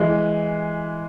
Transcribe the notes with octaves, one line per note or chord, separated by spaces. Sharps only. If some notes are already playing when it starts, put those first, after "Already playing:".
Already playing: E3 G#3